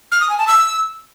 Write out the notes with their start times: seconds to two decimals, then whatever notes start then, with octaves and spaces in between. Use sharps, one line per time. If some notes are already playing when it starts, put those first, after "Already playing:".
0.12 F6
0.21 D#6
0.30 G#5
0.38 A5
0.47 E6